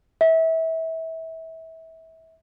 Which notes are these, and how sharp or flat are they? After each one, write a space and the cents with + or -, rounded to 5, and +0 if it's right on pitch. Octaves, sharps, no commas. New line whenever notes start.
E5 -25